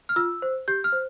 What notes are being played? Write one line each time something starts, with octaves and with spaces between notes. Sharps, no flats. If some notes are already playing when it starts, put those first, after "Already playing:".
F6
F4 E6
C5
G4 G6
F6
C5